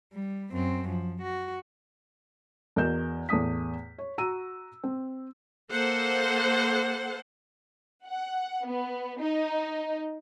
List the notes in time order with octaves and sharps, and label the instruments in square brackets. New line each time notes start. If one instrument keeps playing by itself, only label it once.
[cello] G3
F#2 C4
F3
F#4
[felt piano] E2 F#4 A#4 D#5 G6 E7
E2 A2 A3 D#6 B6
C#5
F#4 A#5 E6 D#7
C4
[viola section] A#3 A4 C5 F#5
[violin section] F#5
B3
D#4